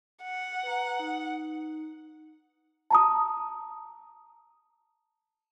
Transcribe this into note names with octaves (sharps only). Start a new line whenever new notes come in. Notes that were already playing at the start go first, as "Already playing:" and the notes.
F#5
B4 A#5
D#4
A5 A#5 D#6